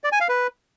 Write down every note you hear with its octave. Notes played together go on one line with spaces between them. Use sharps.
D5
G#5
F5
B4